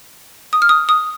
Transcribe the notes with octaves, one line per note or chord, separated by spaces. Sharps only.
D#6
F6
D#6
D#6